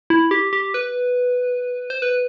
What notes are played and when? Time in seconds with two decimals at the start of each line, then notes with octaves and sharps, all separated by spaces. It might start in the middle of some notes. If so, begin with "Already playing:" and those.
0.10 E4
0.31 G4
0.53 G4
0.74 B4
1.90 C5
2.02 B4